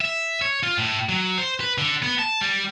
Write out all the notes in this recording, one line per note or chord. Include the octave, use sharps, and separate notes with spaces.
E5
C#5
F4
A2
F#3
C5
B4
D3
B3
A5
G3